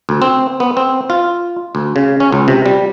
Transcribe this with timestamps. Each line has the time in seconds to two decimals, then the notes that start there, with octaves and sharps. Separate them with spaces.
0.09 D2
0.22 C4
0.60 B3
0.77 C4
1.10 F4
1.75 D2
1.96 C#3
2.20 C#4
2.32 C#2
2.48 C3
2.66 G3